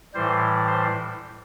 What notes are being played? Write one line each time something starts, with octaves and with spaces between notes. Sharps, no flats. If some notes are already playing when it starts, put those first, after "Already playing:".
A2 E3 G3 C5
C5